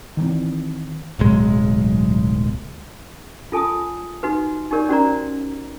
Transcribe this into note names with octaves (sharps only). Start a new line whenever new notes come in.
D#3 E3 A#3 C4
D1 B1 G#3
F4 A4 G#5 A5 D#6
D#4 F#4 B4
D#4 G4 A#4 C#5 D5
C#4 F#4 C5 D5 A#5